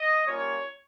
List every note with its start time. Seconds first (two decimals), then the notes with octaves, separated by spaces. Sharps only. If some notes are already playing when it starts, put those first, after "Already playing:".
Already playing: D#5
0.25 G3 A#3 C#4 F4 C#5